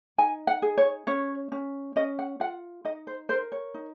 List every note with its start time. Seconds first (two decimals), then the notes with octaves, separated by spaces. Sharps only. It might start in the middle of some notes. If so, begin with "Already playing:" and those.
0.18 D#4 G#5
0.47 F#5
0.62 G#4
0.77 C#5
1.07 C#4 C#5
1.52 C#4
1.96 C#4 D#5
2.19 F#5
2.40 F4 F#5
2.85 D#4 D#5
3.07 C5
3.29 A#4 C5
3.52 C#5
3.74 D#4